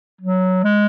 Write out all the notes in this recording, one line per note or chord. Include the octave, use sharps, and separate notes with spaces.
F#3
G#3